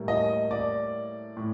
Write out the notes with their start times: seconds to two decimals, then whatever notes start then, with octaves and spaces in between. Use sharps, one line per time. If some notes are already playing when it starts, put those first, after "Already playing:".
Already playing: A2 G3 A#3
0.08 D#5
0.51 D5
1.37 A2